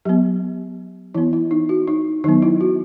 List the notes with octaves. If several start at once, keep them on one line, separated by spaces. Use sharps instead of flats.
F#3 B3 G4
E3 B3 E4
E4
D#4
F#4
D#4
D#3 F#3 B3 D#4
E4
F#4